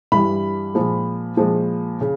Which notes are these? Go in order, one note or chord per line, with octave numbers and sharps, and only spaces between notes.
G2 E3 G3 B5
A#2 F3 G#3
A#2 F3 G#3
C#3